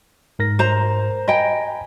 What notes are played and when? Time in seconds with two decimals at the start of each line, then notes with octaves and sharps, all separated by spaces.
0.39 G#2 A#4 A#6
0.59 C5 A#5
1.28 D#5 G5 G#5 A#5 B5